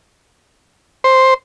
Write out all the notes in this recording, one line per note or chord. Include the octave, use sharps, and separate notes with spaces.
C5